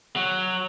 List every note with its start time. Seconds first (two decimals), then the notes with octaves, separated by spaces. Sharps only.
0.16 F#3